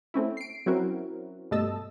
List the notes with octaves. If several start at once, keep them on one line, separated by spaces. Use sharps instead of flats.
A3 C4 C#4 E4
C7 D7
F#3 C4 C#4 E4 F#4 A#4
G2 B2 A3 D#5 A5 E6